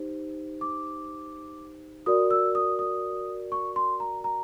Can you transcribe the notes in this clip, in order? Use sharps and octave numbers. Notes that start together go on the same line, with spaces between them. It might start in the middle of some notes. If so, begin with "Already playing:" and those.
Already playing: D#4 G4 C5
D6
F#4 A#4 D5 D#6
E6
D#6
D#6
C#6
C6
A#5
A#5